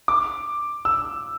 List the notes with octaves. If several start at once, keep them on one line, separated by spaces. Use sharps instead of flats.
D6
E6